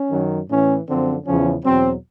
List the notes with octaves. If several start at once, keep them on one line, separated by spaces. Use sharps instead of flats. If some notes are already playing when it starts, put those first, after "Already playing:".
Already playing: C#4
F#2 D#3 F#3
A2 E3 C#4
F#2 D3 F3 C4
E2 C#3 F3 C#4
E2 B2 F#3 C4